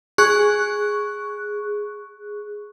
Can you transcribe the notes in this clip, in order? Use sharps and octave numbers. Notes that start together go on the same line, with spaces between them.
G#4 C#6 F#6